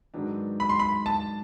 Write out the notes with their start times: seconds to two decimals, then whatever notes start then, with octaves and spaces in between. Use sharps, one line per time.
0.14 G#2 D#3 F#3 B3 D4
0.60 B5
0.69 C6
0.79 B5
1.06 A5